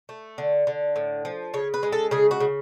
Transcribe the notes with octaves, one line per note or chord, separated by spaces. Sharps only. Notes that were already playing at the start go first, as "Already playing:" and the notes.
A3
D3
D3
A2
F3
C#3 C#5
B4
G#3
A4
C#3 G#4
F#4
C#3